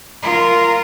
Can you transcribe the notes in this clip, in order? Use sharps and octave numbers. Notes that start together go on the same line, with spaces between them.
F4 A#4